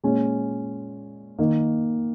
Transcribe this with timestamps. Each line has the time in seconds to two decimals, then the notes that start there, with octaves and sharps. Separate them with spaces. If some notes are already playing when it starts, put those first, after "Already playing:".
0.03 A#2 G#3 C#4
1.39 D#3 A#3 D#4